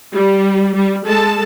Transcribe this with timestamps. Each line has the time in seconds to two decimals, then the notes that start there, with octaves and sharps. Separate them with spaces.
0.13 G3
0.76 G3
1.06 G#3 A4 A5